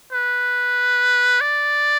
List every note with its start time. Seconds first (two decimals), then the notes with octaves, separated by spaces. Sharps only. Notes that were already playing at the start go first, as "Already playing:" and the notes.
0.13 B4
1.41 D5